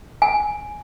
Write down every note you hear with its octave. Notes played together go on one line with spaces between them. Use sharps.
G#5